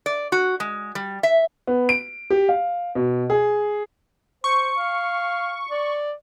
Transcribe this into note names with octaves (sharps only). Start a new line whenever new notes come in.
D5
F#4
G#3
G3
E5
B3
D7
G4
F5
B2
G#4
C5 C#6
F5
D5